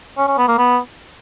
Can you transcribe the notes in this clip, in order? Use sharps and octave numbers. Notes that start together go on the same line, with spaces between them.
C#4
C#4
B3
A#3
B3